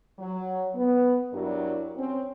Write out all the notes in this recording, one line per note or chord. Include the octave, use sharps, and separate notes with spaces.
F#3
B3
G2 F#3 G3 E4 A#4 D5
C4 C#4